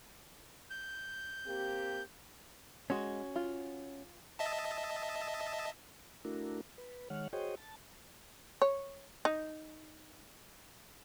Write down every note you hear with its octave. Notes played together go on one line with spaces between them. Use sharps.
G6
A#3 C4 G4
G#3 C#4 F#4
F4
D#5 E5 A5
A3 D4 E4 F#4 A#4
B4
D#3 G#3 C#5 F#5 F6
F#4 G#4 C5 C#5 D#5 G5
A5
C#5
D#4